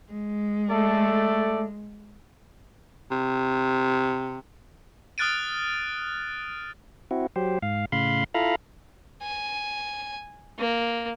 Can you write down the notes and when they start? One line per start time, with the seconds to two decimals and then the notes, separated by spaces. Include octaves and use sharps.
0.12 G#3
0.70 A3 A4 D5
3.11 C3
5.18 D#6 F6 F#6 A6 D7 D#7
7.11 C4 E4 F#4
7.36 F#3 G4 C5
7.62 G#2 F5
7.92 A2 C#3 F5 B5 C6
8.34 E4 F4 A4 F5 A#5 B5
9.22 G#5
10.58 A#3